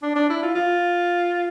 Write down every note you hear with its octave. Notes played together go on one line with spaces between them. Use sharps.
D4
D4
E4
F4
F4